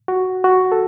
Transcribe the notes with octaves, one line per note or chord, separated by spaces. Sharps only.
F#4
F#4
A4